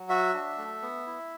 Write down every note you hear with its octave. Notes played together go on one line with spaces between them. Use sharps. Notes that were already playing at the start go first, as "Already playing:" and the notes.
Already playing: F#3
F#4 E5
D4
A3
B3
E4